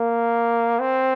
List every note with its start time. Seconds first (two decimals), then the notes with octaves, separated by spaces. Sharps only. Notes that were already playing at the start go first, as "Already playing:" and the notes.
Already playing: A#3
0.80 C4